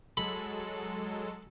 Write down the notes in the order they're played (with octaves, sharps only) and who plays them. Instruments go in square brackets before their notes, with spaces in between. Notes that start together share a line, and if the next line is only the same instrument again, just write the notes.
[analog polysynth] F#3 G#3 A4 [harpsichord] B5